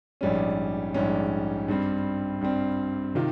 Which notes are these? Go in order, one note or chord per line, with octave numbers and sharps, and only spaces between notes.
A#1 G#2 G3 C#4
A#1 G#2 G3 C#4
G2 G3 C4
G2 G3 C4
C3 D#3 F4